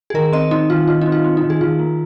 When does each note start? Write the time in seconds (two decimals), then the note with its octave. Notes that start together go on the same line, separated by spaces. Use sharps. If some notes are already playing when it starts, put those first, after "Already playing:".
0.10 G#4
0.14 D#3 A#4
0.32 C4 D#5
0.51 C4 D#4
0.70 D#3 F4
0.88 D#3 F4
1.01 C4 D#4
1.12 F4
1.24 C4
1.37 D#4
1.43 D#3
1.50 G#4
1.61 D#3 F4
1.79 A#3